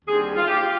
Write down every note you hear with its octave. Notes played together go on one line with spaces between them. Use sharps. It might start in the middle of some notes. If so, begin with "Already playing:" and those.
D#2 D3 G3 C4 G#4
F4
G4
F4